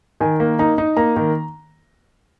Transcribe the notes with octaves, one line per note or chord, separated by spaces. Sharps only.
D#3 G#5
A#3
D#4 A#5
D#4
A#3 A#5
D#3